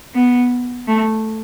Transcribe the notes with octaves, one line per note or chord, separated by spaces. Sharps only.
B3
A3